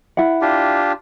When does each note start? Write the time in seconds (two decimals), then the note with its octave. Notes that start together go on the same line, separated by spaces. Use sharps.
0.17 E4 F#5
0.41 D4 F4 G4